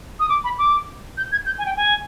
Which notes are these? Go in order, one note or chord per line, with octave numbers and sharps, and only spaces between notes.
D#6
D6
B5
D6
G6
G#6
G6
G#5
G5
G#5